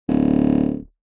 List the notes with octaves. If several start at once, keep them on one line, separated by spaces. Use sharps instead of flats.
D1